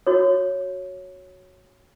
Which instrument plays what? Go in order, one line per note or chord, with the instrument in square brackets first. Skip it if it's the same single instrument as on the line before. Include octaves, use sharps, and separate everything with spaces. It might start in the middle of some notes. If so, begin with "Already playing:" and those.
[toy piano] F#4 C#5